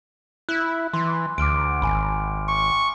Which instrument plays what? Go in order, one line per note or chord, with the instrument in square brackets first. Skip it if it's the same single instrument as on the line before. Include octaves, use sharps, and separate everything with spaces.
[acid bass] E4 [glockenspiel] F#6
[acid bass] E3 [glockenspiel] C6
[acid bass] D2 [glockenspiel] D6 F6 D7
[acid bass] G#1 [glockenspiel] G#5 B5
[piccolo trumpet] C#6